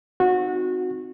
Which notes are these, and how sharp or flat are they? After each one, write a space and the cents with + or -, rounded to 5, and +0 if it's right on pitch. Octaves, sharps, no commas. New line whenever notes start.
C4 +0 D#4 +0 F#4 -20